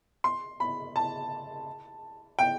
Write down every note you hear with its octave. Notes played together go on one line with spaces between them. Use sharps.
C6
B5
A5
G5